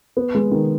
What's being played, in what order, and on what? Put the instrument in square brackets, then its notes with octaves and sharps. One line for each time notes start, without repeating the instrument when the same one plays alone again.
[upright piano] B3
G#3
D#3